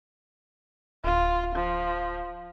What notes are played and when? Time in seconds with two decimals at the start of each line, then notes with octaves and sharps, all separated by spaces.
1.04 D1 F4
1.56 F3